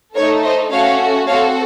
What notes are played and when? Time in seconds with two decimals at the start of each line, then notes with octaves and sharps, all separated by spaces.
0.15 A3 D#4 A4 A#4 C#5
0.43 C5 D#5
0.71 A3 C#4 F#4 A4 C#5 F5
1.27 C4 F#4 A4 C#5 F5